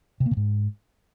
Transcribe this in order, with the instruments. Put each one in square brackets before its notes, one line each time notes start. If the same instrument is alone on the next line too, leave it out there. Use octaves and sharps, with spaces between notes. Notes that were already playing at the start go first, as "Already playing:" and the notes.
[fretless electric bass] C3
A#3
C3
G#2